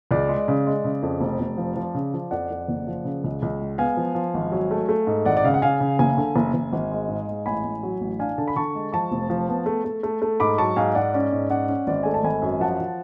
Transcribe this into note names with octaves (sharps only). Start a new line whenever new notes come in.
C#2 D5
G#3
C#3
G#3
C#3
F2
F1
F1
F3
F3
C#3
F3
F2 D5 F#5
F2
F#1
F3
C#3
C#2
C#2
G#3
B3 F5 G#5
F3
F3
G#1
F#3
A3
A3
G#2
G#1 D5 F#5
D5
C#3 F5
F#5
C#3 F5 G#5
C#3
F#1 F5 G#5
D3
F#1
F#1
G#1
G#3
G#2
G#3
A1 G#5 B5
A1
F#3
A1
D4 F5 G#5
D3 A5
B5
D3 A5 C#6
G#3
F3 A5 C#6
F1
F3
B3
A3
A3
A3
A3
G#2 B5 D6
F#3 A5 C#6
G#2 F5 G#5
G#2 D5 F#5
C#4 D5
G#2
C#4 D5 F#5
C#4
G#1 D5
A3 G#5
A5
G#1 G#5 B5
F#2
F3 F#5 A5
F3